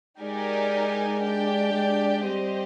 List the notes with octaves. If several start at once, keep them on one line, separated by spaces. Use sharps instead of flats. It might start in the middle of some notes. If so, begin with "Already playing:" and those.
G#3 D#4 G4 A#4 D5 G#5
D4 G4 D5 G5
G#3
G3 C4 G4 C5 D#5